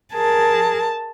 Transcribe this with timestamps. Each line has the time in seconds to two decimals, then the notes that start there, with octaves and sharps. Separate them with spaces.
0.13 G#4 A#4 A5